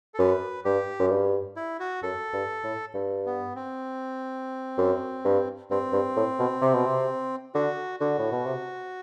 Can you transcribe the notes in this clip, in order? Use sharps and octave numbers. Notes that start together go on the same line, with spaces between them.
A4
F#2 B4
G2 G4
F#2
G2
E4
F#4
F#2 A4
G2
A2
G2
B3
C4
F#2
G2
G2 C4
G2
A2
B2
C3
B2
C3
D3 F#4
D3 F#4
A2
B2
C3